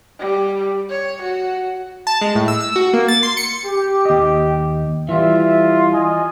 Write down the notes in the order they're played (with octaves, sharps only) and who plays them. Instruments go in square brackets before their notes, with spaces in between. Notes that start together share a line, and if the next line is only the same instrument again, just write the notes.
[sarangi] G3
C#5
F#4
[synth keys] A5
G#3
A2
E6
E6
F#4
A#3
A6
C6
C#7
[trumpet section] G4
[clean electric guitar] D#2 D#5
[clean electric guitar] E3 G3 [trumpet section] F4 E5
[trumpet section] F4 D#5 G#5